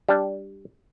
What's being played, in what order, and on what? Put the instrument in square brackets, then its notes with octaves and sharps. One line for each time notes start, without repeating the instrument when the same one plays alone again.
[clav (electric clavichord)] G3 D4